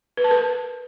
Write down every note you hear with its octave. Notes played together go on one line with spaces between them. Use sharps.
B4
A5
A#4